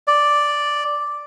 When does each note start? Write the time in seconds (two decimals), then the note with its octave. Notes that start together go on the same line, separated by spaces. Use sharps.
0.07 D5